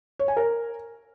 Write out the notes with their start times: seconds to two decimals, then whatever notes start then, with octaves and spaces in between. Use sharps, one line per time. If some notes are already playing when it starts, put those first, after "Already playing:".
0.19 C#5
0.28 G#5
0.37 A#4